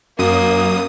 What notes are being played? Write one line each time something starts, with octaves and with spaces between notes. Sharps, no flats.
F#2 A#3 D#6